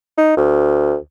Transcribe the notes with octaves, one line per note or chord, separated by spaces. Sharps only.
D#4
D2